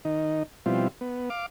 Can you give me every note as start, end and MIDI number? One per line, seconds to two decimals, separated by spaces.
0.05 0.43 51
0.05 0.43 63
0.66 0.88 47
0.66 0.88 53
0.66 0.88 55
0.66 0.88 60
0.66 0.88 64
0.66 0.88 65
1.01 1.29 59
1.30 1.46 77
1.30 1.46 86